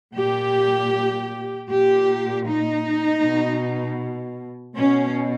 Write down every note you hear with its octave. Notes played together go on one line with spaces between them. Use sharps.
A#2 G4
A#2 G4
D#4
B2
B2 C#4